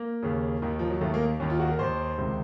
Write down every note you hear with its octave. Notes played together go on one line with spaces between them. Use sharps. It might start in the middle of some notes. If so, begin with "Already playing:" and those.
Already playing: A#3
D#2 C#3
D#2 D#3
F3
F#3
D#2 D#3 A3
A#3
D#2 D#3 C#4
F4
F#4
A#4
D#2 D#3 C5
C#2 C3 D#3